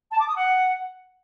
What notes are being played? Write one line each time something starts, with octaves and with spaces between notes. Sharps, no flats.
A5
D6
D#6
F#5